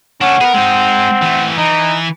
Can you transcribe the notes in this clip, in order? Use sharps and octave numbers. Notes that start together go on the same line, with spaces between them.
A3 C#4 D4 F#5
B3 G#4 A#4
G#3 C4 D#4
E3 A3
E3 D#4